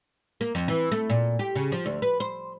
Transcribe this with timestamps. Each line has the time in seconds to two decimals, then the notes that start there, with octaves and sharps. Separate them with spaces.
0.41 A#3
0.55 F2
0.68 E3
0.92 A3
1.10 A#2
1.39 G4
1.56 C#3
1.72 F3
1.86 D2
2.02 B4
2.20 C5